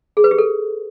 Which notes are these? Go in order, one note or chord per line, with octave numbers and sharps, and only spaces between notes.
G#4
B4
G4
A4